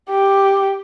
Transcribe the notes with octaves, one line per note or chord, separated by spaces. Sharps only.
G4